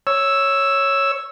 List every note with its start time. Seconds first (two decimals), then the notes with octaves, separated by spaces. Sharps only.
0.07 C#5 E6